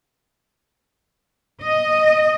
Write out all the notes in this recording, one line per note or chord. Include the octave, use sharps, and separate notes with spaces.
D#5